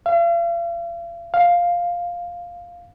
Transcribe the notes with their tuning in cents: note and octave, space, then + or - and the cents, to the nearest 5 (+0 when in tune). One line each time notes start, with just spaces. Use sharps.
F5 -45
F5 +0